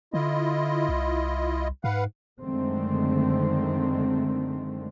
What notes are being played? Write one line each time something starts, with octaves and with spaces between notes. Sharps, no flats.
D3 E4 F4 D#5
C2
G#2 B4 F5 F#5
F#2 D3 D#3 G#3 A3 C4